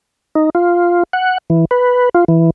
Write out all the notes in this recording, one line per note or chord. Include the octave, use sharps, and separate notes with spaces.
D#4
F4
F#5
E3
B4
F4
E3